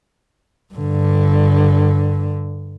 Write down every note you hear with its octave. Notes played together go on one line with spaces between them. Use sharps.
G2 D3